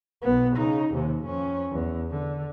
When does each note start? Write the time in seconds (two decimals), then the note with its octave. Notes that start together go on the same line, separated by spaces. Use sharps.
0.22 B1 B3
0.55 C#3 D#4
0.94 D#2 C3
1.24 F2 C#4
1.71 E2
2.10 D3